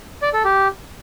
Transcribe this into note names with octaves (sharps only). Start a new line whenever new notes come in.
D5
A4
G4